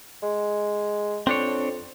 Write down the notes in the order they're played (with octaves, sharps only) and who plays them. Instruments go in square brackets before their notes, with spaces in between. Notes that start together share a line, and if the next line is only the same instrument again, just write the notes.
[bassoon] G#3
[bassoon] F2 [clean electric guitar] C4 D4 C#5